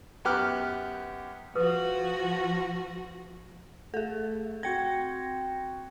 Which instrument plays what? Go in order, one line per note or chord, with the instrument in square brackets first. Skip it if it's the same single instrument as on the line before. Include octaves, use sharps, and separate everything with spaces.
[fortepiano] F#2 B3 G4 D6 F6 F#6
[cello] F3 F#4 [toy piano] G#4 B4 D#6
[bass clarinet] A3 [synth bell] G#4 A4
[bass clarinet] C4 [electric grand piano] F#4 G5 G#6 [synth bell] A#6 C#7